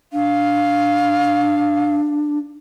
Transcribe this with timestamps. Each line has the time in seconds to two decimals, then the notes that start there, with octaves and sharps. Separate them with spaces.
0.13 D4 F5